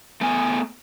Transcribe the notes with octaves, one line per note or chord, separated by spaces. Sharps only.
A3 B3 G#5